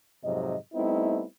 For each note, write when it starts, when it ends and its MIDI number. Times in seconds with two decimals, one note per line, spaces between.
0.24 0.54 41
0.24 0.54 44
0.24 0.54 48
0.24 0.54 54
0.24 0.54 75
0.74 1.23 55
0.74 1.23 57
0.74 1.23 59
0.74 1.23 60
0.74 1.23 63
0.74 1.23 64